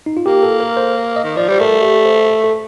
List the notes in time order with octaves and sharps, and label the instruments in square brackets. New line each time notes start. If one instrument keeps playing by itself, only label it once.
[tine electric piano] D#4
F4
[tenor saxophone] A#3 [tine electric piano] G4
[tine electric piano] A4
A#4
C5
D#5
[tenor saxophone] D#3
[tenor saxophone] F3 [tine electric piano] D5
[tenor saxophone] G3 [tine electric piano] C5
[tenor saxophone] A3 [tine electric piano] A#4
[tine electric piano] G4
C5
A4